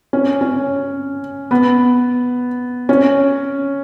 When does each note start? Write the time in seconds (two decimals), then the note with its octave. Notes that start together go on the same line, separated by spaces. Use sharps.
0.13 C#4
0.41 C#4
1.51 B3
2.89 C#4